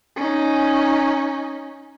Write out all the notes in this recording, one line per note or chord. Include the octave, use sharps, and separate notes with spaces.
C#4 D#4